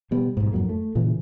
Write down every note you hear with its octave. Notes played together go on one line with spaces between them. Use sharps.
B2 G3 B3
B1 G#2
F2 G#2 F#3 A#3
A3
A#2 C#3 E3